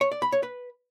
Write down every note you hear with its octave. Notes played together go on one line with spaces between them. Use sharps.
C#5
D5
B5
C#5
B4